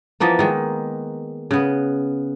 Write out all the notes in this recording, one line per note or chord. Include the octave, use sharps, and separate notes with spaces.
E3 F3 A#3 B3
D#3 G#3
C#3 B3